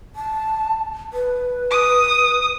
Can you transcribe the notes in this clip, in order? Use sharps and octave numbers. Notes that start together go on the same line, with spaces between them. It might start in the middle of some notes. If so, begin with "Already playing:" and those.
A5
B4
D#6